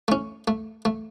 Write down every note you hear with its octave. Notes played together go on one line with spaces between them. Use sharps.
A3 C#4
A3
A3